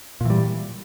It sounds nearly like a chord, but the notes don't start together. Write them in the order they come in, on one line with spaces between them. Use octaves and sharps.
A#2 E3 G3